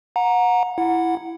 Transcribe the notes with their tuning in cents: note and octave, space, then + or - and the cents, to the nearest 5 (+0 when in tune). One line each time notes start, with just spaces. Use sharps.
F#5 -30 A#5 +5
E4 +10 F#5 -10